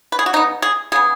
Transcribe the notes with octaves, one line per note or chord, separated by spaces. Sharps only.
B4
G#4
F#4
C#3 B3 D#4
G#4
C#3 B3 G#4